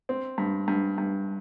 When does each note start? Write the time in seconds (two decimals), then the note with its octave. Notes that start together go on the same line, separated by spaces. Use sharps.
0.09 C4
0.38 G2
0.68 G2
0.98 G2